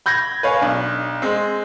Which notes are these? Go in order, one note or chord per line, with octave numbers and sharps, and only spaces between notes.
B5 G6 G#6 A#6
B4 C#5 F5 G#5
B1 D4
G#3 C4